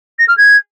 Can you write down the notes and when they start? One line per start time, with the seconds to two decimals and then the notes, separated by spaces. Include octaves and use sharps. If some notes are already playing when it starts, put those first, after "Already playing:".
0.19 A#6
0.28 F6
0.37 G#6